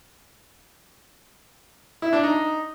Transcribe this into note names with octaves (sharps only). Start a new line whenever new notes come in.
E4
D4
D#4